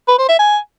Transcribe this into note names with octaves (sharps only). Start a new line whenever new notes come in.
B4
C5
E5
G#5